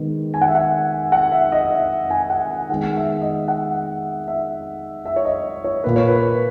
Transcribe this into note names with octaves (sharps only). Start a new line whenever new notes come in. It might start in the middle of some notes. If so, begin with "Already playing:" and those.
Already playing: D#3 G#3 B3
G#5
F#5
E5
F#5
F#5
E5
D#5
E5
G#5
F#5
G#5
D#3 G#3 B3 F#5
E5
D#5
F#5
E5
E5
C#5
D#5
C#5
A#2 A#3 B4
C#5
B4